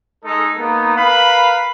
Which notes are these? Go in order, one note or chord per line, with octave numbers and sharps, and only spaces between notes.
G#3 D#4 A4
A#3 B3 D#4
A#4 B4 F5 B5